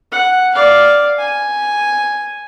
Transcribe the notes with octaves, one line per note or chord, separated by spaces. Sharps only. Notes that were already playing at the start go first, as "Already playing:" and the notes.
F#5
D5 F5
G#5